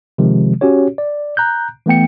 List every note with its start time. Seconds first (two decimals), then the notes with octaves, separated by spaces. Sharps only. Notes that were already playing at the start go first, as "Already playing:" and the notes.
0.18 C3 D#3 F3 G#3
0.61 C#4 F#4 G4 C#5
0.98 D5
1.37 A#5 F#6 G6
1.86 E3 A3 B3 G5 C#7